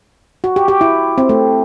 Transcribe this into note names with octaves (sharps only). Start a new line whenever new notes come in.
F#4
G4
G4
E4
C4
A3